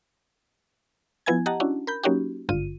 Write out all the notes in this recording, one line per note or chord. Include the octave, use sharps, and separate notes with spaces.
F3 B3 E4 G#5 G#6
G4 D#5 F#5 A5 A#5
C#4 D4 E4 F#4
A#4 B5 G6
F#3 A#3 C#4 D#4 F#4 G4
G#1 G2 D3 F4 D#7